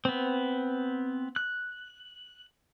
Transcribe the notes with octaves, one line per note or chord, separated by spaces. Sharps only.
B3 C4
F#6